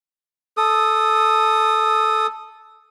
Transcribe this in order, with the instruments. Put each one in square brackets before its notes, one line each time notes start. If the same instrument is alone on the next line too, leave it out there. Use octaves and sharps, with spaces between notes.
[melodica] A4 D#6